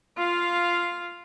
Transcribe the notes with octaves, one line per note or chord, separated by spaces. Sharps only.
F4 F5